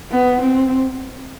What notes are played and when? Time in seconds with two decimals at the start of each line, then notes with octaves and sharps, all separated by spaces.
0.11 B3
0.41 C4